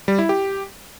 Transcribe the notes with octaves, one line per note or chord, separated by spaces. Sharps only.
G3
E4
G4